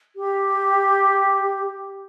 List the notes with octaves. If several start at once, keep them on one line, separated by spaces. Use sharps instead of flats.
G4